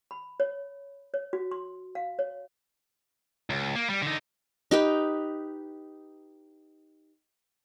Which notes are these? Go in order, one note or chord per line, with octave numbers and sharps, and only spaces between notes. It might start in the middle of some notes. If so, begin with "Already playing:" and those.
B5
C#5
C#5
F#4
C6
F5
C#5
C#2
A#3
G3
D3 D#4
D#4 G4 B4